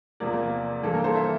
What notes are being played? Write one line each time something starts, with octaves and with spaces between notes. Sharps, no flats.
E2 C3 F3 A#3 A#4 D5
G2 E3 A#3 A4
A#4
A4 C5
C5 E5